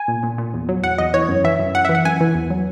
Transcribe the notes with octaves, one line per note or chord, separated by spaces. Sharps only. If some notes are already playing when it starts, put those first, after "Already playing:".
Already playing: G#5
A#2
A#2
A#2
E2
F#3
E2 F#5
E2 D#5
E3 C#5
F#2
E3 E5
F#2
F#2 F#5
E5
E3
F#5
F#2 G#5
E3
E2
F#3